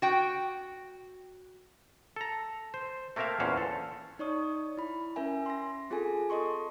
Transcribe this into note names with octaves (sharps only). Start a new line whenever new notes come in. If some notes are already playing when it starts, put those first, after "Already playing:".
F#4 G5
A4 A#5
C5
A3 A#3 C4 A#4 E5 F5
E2 A#2 C#4 C5 F5 F#5
A4
D#4 C#5 D5 C#6 D#6
E4 B5
C#4 A#4 E5 G#5
C6 A#6
C4 F4 G#4 A4 G#5
A4 D#5 C6 C#6